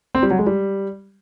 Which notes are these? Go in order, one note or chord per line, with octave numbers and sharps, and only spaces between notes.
C4
G3
F#3
G#3
G3